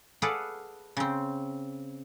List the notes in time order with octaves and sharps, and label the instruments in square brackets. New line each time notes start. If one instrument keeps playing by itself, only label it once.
[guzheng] G#4 A4 B4 D5 F5 F#5
C#3 C4